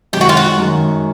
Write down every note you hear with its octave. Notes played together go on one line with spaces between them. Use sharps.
F#2 D#3 G#3 G4
F#4
F4
F#4
F#2 D#3 G#3